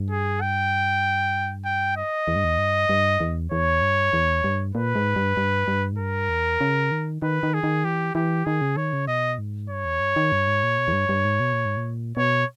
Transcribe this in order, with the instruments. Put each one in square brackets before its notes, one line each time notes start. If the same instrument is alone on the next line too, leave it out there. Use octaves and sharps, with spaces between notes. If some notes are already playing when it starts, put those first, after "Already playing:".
Already playing: [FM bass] G2
[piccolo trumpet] G#4
G5
G5
D#5
[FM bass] E2
G2
E2
G2
G2
E2
[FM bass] E2 [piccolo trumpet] C#5
[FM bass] G2
E2
G2
[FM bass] A#2 [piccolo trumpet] B4
[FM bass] G#2
G2
G2
G2
G#2
[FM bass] G2 [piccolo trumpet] A#4
[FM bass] E2
C#3
D#3
[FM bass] D#3 [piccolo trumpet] B4
[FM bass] D#3
[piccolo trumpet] G#4
[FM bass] D#3
[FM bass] E3 [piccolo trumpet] G4
[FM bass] E3 [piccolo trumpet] G4
[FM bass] D#3 [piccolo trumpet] G#4
[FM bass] C#3
[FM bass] D#3 [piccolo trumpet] C#5
[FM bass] C#3
[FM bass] B2 [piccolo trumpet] D#5
[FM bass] G#2
[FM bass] G2 [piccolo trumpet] C#5
[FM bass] E2
G2
D#3
G2
G#2
A#2
B2
E2
G2
G2
G#2
B2
A#2
G#2
A#2
[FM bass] B2 [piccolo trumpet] C#5